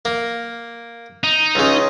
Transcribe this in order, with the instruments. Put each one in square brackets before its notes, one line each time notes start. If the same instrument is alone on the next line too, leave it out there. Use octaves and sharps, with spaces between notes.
[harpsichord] A#3
[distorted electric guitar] D#4
[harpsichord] C#2 C#3